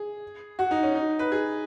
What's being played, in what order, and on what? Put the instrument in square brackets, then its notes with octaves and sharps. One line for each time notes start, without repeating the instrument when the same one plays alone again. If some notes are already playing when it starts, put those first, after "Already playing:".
Already playing: [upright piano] G#4
F#4
D#4
C#4
D#4
B4
G#4